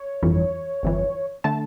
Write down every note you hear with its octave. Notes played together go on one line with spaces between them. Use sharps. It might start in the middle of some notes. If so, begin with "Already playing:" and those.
Already playing: C#5
G1 F2 E3
G1 F2 E3
D3 A3 A5